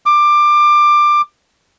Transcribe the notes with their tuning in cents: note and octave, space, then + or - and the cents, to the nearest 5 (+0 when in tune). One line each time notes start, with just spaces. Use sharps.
D6 +20